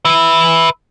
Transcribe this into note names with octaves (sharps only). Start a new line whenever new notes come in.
B4 E5